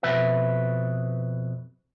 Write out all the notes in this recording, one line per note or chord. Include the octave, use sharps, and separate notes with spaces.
F2 B2 B4 E5